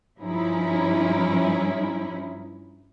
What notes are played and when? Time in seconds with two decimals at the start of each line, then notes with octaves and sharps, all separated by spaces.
0.20 G2 F3 C#4 D#4 E4